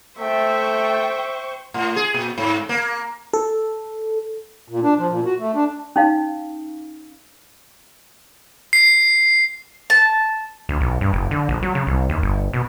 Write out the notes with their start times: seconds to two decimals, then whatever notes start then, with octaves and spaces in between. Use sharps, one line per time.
0.19 A3 C5 E5 G5 C#6
1.74 A2
1.96 G#4
2.14 A#2
2.38 G#2
2.69 A#3
3.33 A4
4.68 A#2
4.83 D4
4.99 F3
5.10 A#2
5.25 F#4
5.40 A3
5.55 D4
5.96 C#4 D#4 F5
8.73 C7
9.90 A5
10.69 D2
10.81 B1
11.01 G2
11.13 F#1
11.31 D3
11.49 A#1
11.63 F#3
11.75 C#3
11.87 C2
12.09 D#2
12.22 G1
12.53 B2